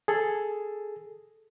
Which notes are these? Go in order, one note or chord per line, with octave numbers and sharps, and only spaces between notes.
G#4 A4